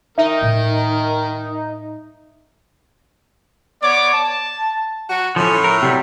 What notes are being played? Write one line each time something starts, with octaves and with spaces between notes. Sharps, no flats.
D#3 D#4 A#4 E5
A2 G3
B3 C#5 D5 D6
A5
F#3 F#4
A2 F3 C#4
A#4
C3 F#3 G3